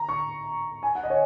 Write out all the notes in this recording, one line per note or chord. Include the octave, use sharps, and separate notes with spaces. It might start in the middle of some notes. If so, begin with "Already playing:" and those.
Already playing: A#5
C#6
G#5
F#5
D#5
C#5